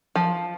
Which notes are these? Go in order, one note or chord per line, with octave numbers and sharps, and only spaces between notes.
F3